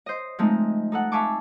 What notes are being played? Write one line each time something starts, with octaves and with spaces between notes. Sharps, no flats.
C5 D#5
F3 G#3 A3 C4 D#4
D#4 A4 F#5
E5 F5 G#5 A5 C#6 D6